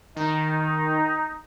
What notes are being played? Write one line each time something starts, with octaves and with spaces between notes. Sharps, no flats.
D#3 D#4